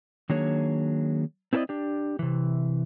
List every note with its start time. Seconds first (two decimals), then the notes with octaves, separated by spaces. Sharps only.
0.29 D#3 F#3 A#3 D4 G#4 C#5
1.53 C4 E4 A4 A#4 D5 D#5
1.69 D4 G4
2.19 C3 E3